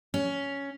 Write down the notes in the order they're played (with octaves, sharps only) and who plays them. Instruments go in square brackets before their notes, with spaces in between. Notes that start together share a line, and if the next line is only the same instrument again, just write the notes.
[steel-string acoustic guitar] C#4